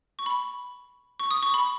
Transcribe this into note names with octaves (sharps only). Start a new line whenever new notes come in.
C#6
B5
C#6
D#6
C#6
B5